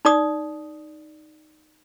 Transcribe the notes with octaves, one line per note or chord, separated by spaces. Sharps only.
D#4 D5 D#6